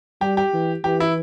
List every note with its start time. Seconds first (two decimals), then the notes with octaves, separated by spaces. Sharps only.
0.21 G3 G4
0.37 G4
0.53 E3
0.84 E3 G4
1.00 E4